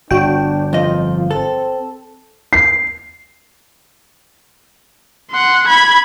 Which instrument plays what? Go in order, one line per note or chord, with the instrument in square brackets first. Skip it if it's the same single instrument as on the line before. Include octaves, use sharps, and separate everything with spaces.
[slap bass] G1 [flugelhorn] D4 [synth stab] F#4 G5
[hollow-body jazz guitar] F2 D#5 [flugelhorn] F4
[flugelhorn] C4 [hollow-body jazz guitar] A4
[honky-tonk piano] C7
[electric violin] F#5 C6
B5 G#6